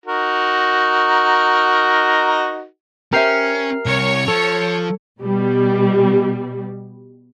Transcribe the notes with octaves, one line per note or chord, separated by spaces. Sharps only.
D#4 F#4 A#4
C#4 G4 A#4 C5 E5 F6 C7
C2 C#5
F3 A4
B2 G3